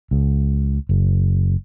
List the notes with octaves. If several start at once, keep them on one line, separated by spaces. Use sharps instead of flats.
C#2
F#1